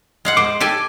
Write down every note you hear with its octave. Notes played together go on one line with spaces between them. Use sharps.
G#3 F5 F#5
C5 D6
G4 A4 G#5